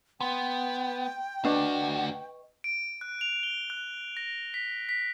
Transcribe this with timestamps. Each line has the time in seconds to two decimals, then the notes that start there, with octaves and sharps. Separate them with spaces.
0.21 B3 G5 C6
1.45 D2 D4 F#4 B4 D#5 C#6
2.64 D7
3.01 F#6
3.21 F7
3.43 G7
3.70 F#6
4.17 A#6
4.54 B6
4.89 B6